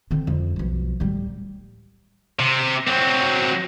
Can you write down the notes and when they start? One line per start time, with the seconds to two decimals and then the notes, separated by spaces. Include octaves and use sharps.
0.11 D3 C4
0.27 F2
0.56 B1 F3
1.00 D1 G3
2.39 C3
2.87 F#3 C4